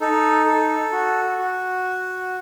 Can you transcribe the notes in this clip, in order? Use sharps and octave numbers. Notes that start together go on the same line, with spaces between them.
D#4 A4
A4
F#4
F#4